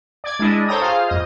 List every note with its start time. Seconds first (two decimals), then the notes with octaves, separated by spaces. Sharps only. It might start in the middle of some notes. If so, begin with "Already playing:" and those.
0.24 D5 G#6
0.39 G#3 D4 E4 D#5
0.67 A4 C5 C#5 G5 A#5 D#6
0.82 F4 G#4 C5 F5
1.08 F2 D#5